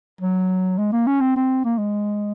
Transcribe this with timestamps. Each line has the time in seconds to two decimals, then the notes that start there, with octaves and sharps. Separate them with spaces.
0.21 F#3
0.78 G#3
0.92 A#3
1.07 C#4
1.21 C4
1.36 C4
1.64 A#3
1.78 G#3